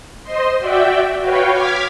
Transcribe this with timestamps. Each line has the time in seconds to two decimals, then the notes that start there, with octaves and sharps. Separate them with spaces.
0.24 C5 D#5 C6
0.59 F#4 D5 E5 G5
1.19 F#4 B4 C#5 F5 G5
1.51 D6 F6 G#6 B6